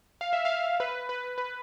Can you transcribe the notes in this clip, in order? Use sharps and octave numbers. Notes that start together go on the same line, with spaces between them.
F5
E5
F5
B4
B4
B4